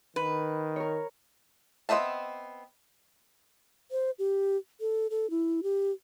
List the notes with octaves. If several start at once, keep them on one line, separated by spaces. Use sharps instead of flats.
D#3 B4
A#4 C#5
B3 C4 D#5 E5 A5
C5
G4
A4
A4
E4
G4